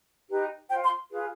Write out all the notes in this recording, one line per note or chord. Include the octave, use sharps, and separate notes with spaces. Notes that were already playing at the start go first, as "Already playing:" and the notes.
D#4 G4 B4
F4 C5 G5
C6
F4 G#4 B4